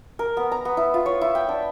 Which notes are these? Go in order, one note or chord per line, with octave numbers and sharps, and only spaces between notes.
A#4
B3
A#5
B3
E4
F4
C#5
E4
G5
D4